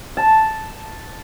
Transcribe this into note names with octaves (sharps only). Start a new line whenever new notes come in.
A5